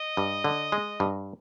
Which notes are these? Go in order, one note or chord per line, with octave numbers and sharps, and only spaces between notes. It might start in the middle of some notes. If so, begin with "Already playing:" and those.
Already playing: D#5
G2
D3
G#3
G2